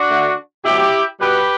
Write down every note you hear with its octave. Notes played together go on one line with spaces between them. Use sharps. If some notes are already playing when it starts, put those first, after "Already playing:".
Already playing: D4 F#4
D3 A3
B2 F#3 A3 E4 G4
B2 G3 B3 G4 B4